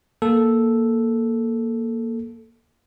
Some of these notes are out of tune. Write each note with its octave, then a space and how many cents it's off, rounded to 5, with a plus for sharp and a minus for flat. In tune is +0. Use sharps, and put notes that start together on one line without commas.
A#3 +0 A4 -5